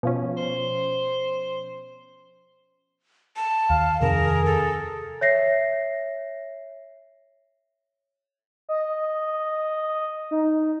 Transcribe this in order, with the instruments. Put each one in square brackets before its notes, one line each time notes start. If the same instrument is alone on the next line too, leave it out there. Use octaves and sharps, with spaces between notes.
[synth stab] B2 F3 C#4
[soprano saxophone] C5
[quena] A5
[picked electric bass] D#2 [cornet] F5
[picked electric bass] F2 C3 D#3 [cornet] G#4 [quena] A#4
[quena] A4
[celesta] C#5 E5 A#6 C7
[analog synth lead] D#5
D#4